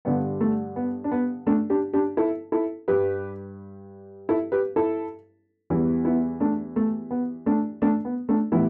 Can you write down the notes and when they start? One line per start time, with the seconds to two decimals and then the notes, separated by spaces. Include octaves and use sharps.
0.05 G2 D3 G3 B3
0.41 A3
0.76 B3
1.04 D4
1.11 B3
1.47 A3 D4
1.70 D4 G4
1.93 D4 G4
2.17 E4 A4
2.52 E4 A4
2.88 G2 G3 G4 B4
4.29 E4 A4
4.52 G4 B4
4.76 E4 A4
5.70 E2 E3 G3
6.05 B3 E4
6.40 A3 D4
6.76 A3
7.11 B3
7.46 A3 D4
7.82 A3 D4
8.05 B3
8.29 A3 D4
8.52 A2 E3 G3 B3 E4